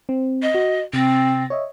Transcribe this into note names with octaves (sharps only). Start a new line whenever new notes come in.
C4
D#5
F#4
C3 C4 A6 A#6
C#5 D#5 E5